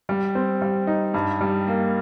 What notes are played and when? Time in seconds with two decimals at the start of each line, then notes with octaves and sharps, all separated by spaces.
0.09 G3
0.35 C4
0.62 G3
0.87 D#4
1.14 G2
1.41 G3
1.67 A#3